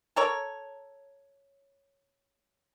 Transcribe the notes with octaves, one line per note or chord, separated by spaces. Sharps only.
A4 A#4 C#5